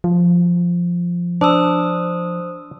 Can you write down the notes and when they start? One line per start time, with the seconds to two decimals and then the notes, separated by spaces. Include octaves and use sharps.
0.04 F3
1.41 D4 C5 D#6 E6